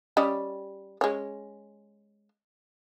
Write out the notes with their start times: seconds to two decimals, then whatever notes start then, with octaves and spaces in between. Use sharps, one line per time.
0.17 G3 C#4 D#5
1.01 G#3 C#4